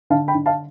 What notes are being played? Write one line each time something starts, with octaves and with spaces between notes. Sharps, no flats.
D3 F5 A5
G5 B5
D3
F5 A5